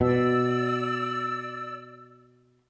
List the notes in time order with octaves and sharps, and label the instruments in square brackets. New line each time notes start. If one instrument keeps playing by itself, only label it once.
[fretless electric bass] B2 [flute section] D5 E6